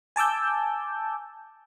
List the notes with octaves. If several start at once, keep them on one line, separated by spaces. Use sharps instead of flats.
G#5 A5 D6 E6 G6